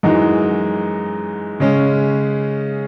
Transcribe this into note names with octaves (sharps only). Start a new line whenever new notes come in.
F#2 E3 G#3 D#4 F#4
C#3 G#3 C#4